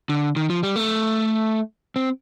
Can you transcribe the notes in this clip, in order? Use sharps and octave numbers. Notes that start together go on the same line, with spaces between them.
D3
D#3
F3
G3
A3
C4